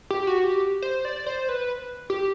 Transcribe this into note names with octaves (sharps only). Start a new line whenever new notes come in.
G4
F#4
G4
C5
D5
C5
B4
G4